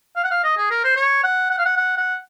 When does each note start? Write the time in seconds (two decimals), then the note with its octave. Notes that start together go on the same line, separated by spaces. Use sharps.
0.16 F5
0.24 F#5
0.31 F5
0.44 D#5
0.57 G#4
0.71 A#4
0.84 C5
0.96 C#5
1.23 F#5
1.50 F#5
1.58 F5
1.65 F#5
1.77 F#5
1.97 F#5